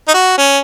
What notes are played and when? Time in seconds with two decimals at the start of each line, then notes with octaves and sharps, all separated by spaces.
0.08 D#4
0.14 F#4
0.38 C#4